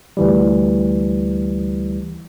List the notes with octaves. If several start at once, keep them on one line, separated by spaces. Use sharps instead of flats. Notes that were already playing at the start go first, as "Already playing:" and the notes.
D2 E3 G3